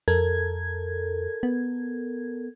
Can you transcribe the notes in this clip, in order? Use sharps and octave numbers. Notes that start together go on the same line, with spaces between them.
F2 A4 A#4 G#6
B3